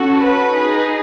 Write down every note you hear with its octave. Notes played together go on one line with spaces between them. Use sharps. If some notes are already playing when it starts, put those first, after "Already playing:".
Already playing: C#4 F#4 A4
B4
D#4 G#4